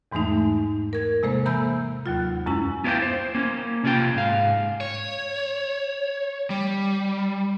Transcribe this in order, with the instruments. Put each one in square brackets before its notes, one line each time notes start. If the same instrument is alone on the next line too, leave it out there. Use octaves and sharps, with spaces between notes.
[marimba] E2 G#2 E3 G#3 A3 D#4
A#4 G#6
C3 G#3 A#3 A4 C5
E3 A#5 B5 E6 G6
D#2 F#3 F4
F#2 G#3 C#4 E4
[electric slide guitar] B3 E4 F4 C#5 D5 G5
C5
A#3 C#4
C3 C#4 D4 F4 G5
G#2 F5
C#5
G3